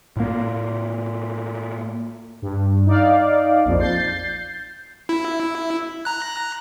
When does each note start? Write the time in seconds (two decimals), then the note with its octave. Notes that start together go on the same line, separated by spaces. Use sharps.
0.16 A2 A#3
2.42 G2
2.86 D#4 D5 F5
3.65 A#1 F2
3.80 G6 A6 C7
5.09 E4
6.05 A#5 F#6